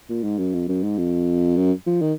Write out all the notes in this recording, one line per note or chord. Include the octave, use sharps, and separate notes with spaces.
A#2
G#2
F#2
F2
F#2
G#2
F2
F#2
F3
D#3